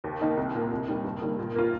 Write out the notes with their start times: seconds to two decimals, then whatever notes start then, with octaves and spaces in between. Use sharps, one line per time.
0.04 D#2
0.21 D#3 A#3 D#4
0.37 C2
0.54 A#2 A#3
0.71 F1
0.88 D#2 D#3 G3 A#3
1.04 G2
1.21 D#3 G3 A#3
1.39 A#2
1.55 A#3 F4